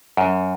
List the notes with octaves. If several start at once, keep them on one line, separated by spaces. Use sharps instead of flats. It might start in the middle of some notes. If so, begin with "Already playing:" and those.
F#2